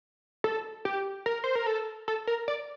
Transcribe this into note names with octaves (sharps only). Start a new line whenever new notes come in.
A4
G4
A#4
C5
A#4
A4
A4
A#4
D5